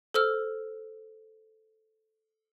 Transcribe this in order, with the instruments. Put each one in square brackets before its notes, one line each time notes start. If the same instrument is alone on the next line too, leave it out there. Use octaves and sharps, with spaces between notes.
[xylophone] A4 C5 E6 F6